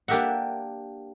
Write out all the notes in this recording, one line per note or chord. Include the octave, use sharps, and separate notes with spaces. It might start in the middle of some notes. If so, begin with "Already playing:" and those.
A#3 D4 G4 A#4 E5 F#5